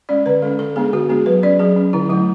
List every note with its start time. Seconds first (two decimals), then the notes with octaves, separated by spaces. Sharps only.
0.09 G#3 C#4 D5
0.26 D3 B4
0.42 G#3 A4
0.45 C#4
0.59 D3 A4
0.76 G#3 B3 D4 G#4
0.93 D3 F#4
1.09 G#3 B3 D4 G#4
1.26 F#3 B4
1.43 C#4 D5
1.59 F#3 G#4
1.76 C#4
1.93 D3 E4
2.09 F#3 A3 E4